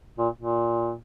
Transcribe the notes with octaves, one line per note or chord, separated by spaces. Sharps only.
A#2
A#2